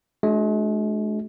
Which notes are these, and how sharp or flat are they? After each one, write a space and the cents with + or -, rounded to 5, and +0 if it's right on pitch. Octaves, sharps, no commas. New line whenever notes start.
G#3 +45 D4 +0 F#4 +0